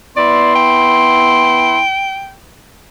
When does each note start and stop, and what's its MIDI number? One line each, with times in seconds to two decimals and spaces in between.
0.17 1.81 59
0.17 1.81 64
0.17 0.51 74
0.17 1.81 84
0.55 2.34 79